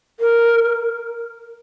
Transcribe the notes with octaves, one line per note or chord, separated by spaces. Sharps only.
A#4